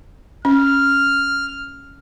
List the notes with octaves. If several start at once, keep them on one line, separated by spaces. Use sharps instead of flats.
C#4 F6